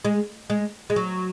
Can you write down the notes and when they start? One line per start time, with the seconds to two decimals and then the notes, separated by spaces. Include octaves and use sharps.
0.05 G#3
0.50 G#3
0.90 G#3
0.96 F#3